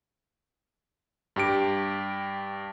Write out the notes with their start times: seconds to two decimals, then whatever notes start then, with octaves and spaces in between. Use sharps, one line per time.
1.36 G2 G4 D7